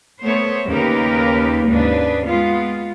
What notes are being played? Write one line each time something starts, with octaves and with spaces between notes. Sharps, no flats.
A3 B3 C5 C#5
D#2 C#3 A#3 G4 A#4 B4
D#2 G#2 C#3 D4 B4
G#3 B3 F4